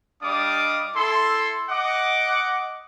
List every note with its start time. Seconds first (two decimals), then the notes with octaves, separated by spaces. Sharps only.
0.22 G3 D4 D#5 F5 D6 D#6
0.95 E4 A4 C6
1.69 D#5 F#5 D6